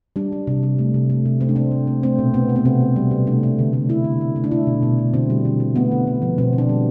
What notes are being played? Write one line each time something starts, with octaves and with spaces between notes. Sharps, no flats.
G3 D4
G3
C3
G3
A3
C3
A3
C3
A3 C4
D4
A3 C4
A3
A3
A3 C4
B2
A3 B3
A3
B3
C3 C4
C3
G3
C3
A3 D4
A3
D3
A3
D3 E4
D3
D3
A3
D4
A3 E4
B2
B2
A3
D3 C4
G3
D3
D3
A3 B3
D3
D3
F3
B2 C4
B2
D4
G3